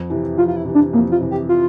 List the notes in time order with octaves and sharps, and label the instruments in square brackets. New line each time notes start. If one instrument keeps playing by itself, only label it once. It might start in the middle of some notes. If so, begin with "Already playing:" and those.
Already playing: [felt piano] F2
C3 E3
[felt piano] F2 [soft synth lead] F4
[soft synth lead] F4
E4
[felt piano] C3 E3
[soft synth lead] D4
[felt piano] F2 [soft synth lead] A#3
[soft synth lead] F4
[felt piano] C3 E3
[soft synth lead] G4
F4